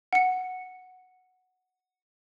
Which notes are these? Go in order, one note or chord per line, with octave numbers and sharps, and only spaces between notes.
F#5 C#7